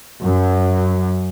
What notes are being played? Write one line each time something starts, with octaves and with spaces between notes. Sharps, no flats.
F#2